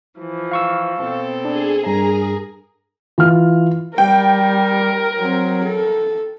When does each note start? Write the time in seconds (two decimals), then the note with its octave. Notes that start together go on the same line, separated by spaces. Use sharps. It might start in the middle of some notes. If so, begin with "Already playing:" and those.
0.19 E3 F3
0.51 F5 C#6 E6
0.99 B2 C4 A4
1.45 D4 G#4
1.86 G2 A#4 A#5
3.18 E3 F4 F6
3.98 G3 A#4 G5
5.18 F#3 C4
5.64 A4